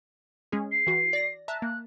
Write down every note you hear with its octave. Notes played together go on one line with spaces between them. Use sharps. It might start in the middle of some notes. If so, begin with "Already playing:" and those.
G#3 C#4 G#4
C7
E3 F#4
D5 A#6
E5 A5 A#5 F#6
A#3 F#6